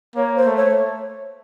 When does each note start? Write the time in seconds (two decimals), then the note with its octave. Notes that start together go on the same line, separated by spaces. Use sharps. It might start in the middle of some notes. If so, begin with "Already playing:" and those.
0.15 A#3 C#5
0.36 C5
0.46 A3
0.56 C#5